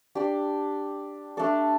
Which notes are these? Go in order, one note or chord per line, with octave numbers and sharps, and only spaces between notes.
D4 G4 D5
A3 D4 A4 D5